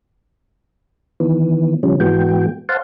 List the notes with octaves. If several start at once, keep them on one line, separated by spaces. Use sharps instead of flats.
D#3 E3 B3
C#3 F3 G3 C#4
G#2 E3 G#3 B3 F#4 G5
C5 F5 F#5 A5 C6